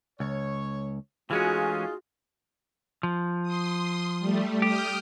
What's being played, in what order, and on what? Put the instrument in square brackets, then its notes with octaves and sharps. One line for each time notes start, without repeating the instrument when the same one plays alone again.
[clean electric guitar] C#2 [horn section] C#5
[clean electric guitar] E3 G#3 C#4 [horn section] A3 D#4 F4 [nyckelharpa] F#4 [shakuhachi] G#4
[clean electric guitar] F3
[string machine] C6 D#6
G3 A3
[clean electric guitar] G4 [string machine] D#6 F6 G6